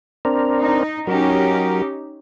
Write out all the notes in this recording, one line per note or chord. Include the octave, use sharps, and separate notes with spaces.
C4 D4 A#4
D#4
F#3 C#4 D#4 G4 A#4